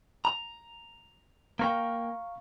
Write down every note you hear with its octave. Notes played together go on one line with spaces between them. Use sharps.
A#5
A#3 A#4 F5 G5 A#5 C#6